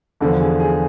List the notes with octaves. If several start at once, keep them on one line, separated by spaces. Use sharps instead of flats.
E2 D3 F3 A4
G#4
G#4